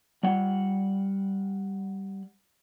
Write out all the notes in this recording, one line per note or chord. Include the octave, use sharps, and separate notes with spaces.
G3 F#5